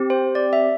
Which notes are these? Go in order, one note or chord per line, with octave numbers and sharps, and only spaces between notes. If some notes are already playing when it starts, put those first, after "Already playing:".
Already playing: C4 G4
C5
D5
E5